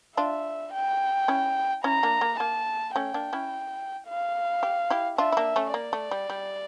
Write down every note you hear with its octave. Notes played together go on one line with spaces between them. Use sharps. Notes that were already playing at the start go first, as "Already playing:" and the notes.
D4 F4 E5
G5
C#4 E4
C#4 E4 A#5
A#3 D4
A#3
A#3 A5
A3 C#4 G5
A#3 D4
C#4 E4
F5
G4
E4 G4
D4 F4 E5
E4
A#3 D4
A3 C#4
A#3 D5
A3
G3
G3